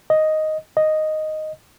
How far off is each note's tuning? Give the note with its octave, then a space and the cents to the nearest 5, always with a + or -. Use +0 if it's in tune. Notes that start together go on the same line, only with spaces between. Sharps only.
D#5 +0
D#5 -5